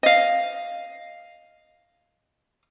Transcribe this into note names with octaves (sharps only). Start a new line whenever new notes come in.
D#5 F5